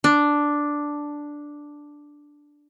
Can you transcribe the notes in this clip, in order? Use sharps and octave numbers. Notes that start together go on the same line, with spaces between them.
D4